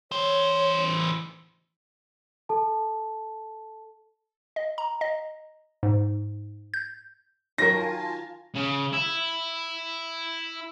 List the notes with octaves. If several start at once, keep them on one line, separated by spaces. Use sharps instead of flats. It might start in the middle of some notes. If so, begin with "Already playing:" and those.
E3 C5 C#5
A4 A5
D#5
A#5
D#5
G#2
G6
D#3 F#3 F4 A#4 G#5 A5 A#6
C#3
E4